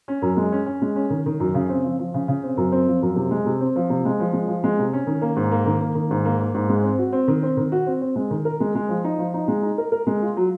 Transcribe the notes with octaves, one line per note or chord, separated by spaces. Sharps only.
C#4
F#2
G#3
C#4
C#4
G#3
C#4
D#3
D#3
F#2
C#3
C4
F3
F3
C#3
C#3
C4
F#2
C4
F3
F#2
C3
G#3
C3
C4
F3
C3
G#3
F3
G#3
F3
G#3
C3
C#4
D#3
A#3
G#2
A#3
D#3
A#3
D#3
G#2
A#3
A#3
G#2
G#3
C4
F#4
C4
D#3
C4
D#3
F#4
C4
C4
G#3
D#3
A#4
G#3
G#3
F3
D#4
F3
D#4
G#3
D#4
A#4
A#4
G#3
F4
F#3